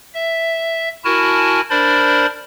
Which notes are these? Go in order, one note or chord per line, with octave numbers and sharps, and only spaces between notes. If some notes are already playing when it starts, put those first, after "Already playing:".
E5
E4 F#4 A#4 G#5 A5
D4 A#4 C5 D5 B5